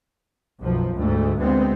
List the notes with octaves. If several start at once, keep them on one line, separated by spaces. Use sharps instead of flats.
B1 F#2 F3
D2 G#2 A3
D2 G#3 B3 C4